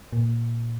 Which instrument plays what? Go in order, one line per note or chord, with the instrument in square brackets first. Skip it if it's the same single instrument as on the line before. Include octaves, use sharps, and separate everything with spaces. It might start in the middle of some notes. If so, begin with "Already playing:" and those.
[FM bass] A#2